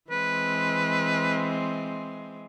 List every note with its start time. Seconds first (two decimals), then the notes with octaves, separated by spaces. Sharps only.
0.10 E3 G#3 C4 B4